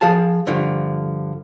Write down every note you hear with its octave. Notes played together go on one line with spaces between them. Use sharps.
F3 G#4 F5 A5
G2 D3 F3